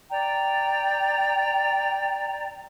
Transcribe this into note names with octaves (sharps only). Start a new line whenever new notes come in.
D5 G5 A#5